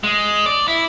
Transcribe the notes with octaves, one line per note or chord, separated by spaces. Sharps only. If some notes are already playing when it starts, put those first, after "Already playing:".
G#3
D5
E4